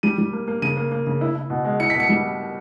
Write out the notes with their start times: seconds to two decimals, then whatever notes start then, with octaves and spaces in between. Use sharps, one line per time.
0.03 G3 D#7
0.18 G3
0.33 A#3
0.48 A#3
0.62 C#3 D#7
0.77 A#3
0.92 A#3
1.07 C#3
1.21 E4
1.35 E4
1.50 B2
1.65 G#3
1.80 E4 C#7
1.90 B2 B6
2.00 C#7
2.09 G3